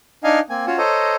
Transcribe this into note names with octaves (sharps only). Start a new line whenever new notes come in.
D4 D#4 D#5 F5 G#5
A#3 C4 G#5
C#4 F4 F#4 C#5
A4 C5 C#5 D#5 A#5